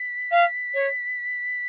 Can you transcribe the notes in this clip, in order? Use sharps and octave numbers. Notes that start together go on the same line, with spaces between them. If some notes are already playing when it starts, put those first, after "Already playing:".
Already playing: B6
F5
C#5